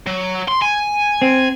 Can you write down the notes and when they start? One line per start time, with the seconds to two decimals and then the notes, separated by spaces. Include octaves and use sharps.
0.07 F#3
0.48 C6
0.62 G#5
1.22 C4